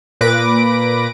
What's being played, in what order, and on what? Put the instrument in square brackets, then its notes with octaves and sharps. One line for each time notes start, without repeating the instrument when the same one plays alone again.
[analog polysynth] A#2 B4 D6 A#6 D7